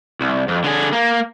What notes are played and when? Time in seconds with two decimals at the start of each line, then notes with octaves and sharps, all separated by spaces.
0.21 C2
0.48 F2
0.64 D3 G#4
0.92 A#3